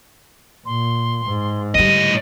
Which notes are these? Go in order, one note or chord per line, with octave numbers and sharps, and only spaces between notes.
A#2 C6
G#2
A2 D3 G3 D#5 D#7